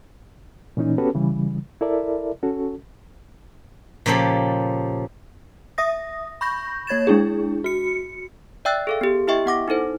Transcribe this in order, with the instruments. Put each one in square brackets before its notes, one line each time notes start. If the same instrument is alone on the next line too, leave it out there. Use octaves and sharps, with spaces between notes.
[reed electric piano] A#2 E3 C#4 D#4
B3 C#4 F#4 G4 A4 B4
C#3 E3 G3
E4 A4 A#4 D5 E5
C#4 F#4 A4
[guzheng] A#2 C#3 F3 G4 A4
[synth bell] E5 D#6 A#6
B5 C#6 G6 A#6
A#3 C#5 G#6 A6 E7
G#3 D4 E4 G#4
F#4 C#7
[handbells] D5 E5 G5 E6 F#6 A6
G#4 A4 F5
B3 G4
E4 G4 D#5 E5 G5 C#6
B3 F#5 D6 A#6
D#4 E4 A4 C5